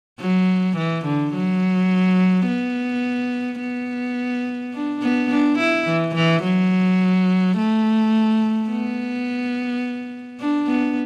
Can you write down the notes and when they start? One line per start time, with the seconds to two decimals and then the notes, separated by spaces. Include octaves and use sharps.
0.20 F#3
0.77 E3
1.05 D3
1.33 F#3
2.47 B3
3.60 B3
4.74 D4
5.02 B3
5.30 D4
5.59 E4
5.87 E3
6.15 E3
6.43 F#3
7.57 A3
8.70 B3
10.40 D4
10.68 B3